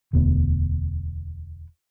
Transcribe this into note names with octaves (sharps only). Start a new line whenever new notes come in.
E1 D2 B3